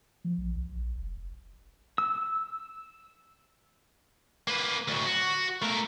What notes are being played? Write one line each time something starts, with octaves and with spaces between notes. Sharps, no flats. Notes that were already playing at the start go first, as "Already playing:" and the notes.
F3
A#1
C2
A#1
F1
F#1
E6
A#3 B4
D2 F#3
F#4
A3 A#4